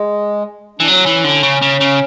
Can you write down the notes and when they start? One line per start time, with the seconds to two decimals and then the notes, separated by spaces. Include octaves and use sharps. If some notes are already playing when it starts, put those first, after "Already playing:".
Already playing: G#3
0.79 E3 D4
0.88 F#3 C#4
1.06 E3
1.24 D3
1.43 C#3
1.62 C#3
1.81 C#3